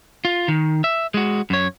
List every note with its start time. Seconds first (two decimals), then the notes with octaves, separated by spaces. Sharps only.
0.25 F4
0.48 D#3
0.84 E5
1.14 G#3 F#4
1.50 F#2 C#5